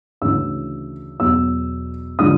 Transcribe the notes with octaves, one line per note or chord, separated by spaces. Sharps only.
D2 C#3 E3 E6
E2 B2 F#3 E6
D3 F3 G#3 D#6